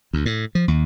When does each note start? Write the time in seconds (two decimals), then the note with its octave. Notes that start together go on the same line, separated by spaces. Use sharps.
0.13 D2
0.26 A2
0.55 F3
0.68 D#2